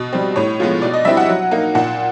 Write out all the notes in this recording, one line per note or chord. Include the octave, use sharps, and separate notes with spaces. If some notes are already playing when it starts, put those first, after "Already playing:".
Already playing: B2
G3 C4
A2 C#5
F3 G#3 B3
B2 D5
D#5
G3 C4 E4 E5
F#5
F#3
A#3 D#4
A#2 F#5